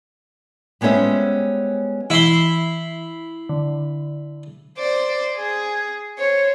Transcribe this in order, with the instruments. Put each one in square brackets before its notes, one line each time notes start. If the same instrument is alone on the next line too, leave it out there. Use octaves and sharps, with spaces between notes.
[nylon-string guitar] G3 G#3 B3 C#4 C5 E5
[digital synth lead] E3 [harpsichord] E4 C6
[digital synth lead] D3
[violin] C5 D5
G#4
C5 C#5